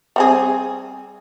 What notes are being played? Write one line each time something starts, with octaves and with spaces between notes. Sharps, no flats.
G3 C4 G#4